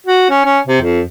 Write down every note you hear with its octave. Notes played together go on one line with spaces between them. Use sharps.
F#4
C#4
C#4
C3
F2